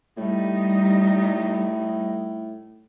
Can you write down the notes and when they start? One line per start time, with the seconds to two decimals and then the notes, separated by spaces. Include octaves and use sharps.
0.17 A2 G3 D#4